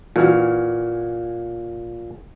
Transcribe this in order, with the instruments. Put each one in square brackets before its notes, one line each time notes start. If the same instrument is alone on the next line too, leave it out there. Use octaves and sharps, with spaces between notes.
[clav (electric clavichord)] A#2 [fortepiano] E3 F#4 F6